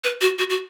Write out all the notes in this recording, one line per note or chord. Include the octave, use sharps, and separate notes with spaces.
B4
F#4
F#4
F#4